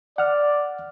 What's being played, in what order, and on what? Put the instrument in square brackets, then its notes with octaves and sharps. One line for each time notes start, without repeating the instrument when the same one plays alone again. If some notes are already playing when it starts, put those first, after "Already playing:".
[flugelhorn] D5 [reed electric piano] F#5 F6